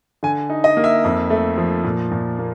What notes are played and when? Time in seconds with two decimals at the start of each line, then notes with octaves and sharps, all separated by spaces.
0.23 D3 G#5
0.50 D#4
0.64 D#5
0.77 A#3
0.84 E5
1.04 F2
1.30 A3
1.57 F3
1.84 A#2
2.12 A#2
2.39 A#3